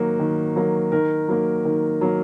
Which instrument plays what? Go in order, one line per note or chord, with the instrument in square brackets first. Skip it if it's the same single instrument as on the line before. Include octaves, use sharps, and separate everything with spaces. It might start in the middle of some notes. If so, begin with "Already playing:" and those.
Already playing: [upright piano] D#3 F#3 A#3 F#4
D#3
F#3 A#3
D#3 A#4
F#3 A#3
D#3
F#3 A#3